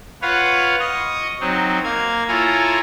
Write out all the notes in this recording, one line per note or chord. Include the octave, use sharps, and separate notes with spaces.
F4 B4 C#5 F5 F#5
D#5 C#6 D#6
F#3 C4 D#4
A#3 F5 G#6
E4 F4 A4 C#5 G#5 A#5